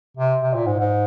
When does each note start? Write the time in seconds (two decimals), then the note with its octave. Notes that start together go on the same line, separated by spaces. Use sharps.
0.17 C3
0.42 C3
0.54 A#2
0.66 G#2
0.79 G#2